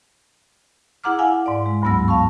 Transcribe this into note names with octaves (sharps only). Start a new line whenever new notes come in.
E4 G#4 F#5 A#5 D6 F6
E4 F5 F#5 G#5
G#2 D5
G#3
D2 G2 F#3 B3 E6 A#6
F5 A5 C#6